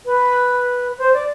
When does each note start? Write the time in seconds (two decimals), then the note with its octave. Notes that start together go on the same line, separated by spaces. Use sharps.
0.06 B4
0.98 C5
1.14 D5